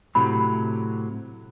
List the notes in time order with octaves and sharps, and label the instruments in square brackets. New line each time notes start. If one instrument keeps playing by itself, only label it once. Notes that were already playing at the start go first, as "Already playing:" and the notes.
[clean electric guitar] A2 C3 F#3 [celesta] B5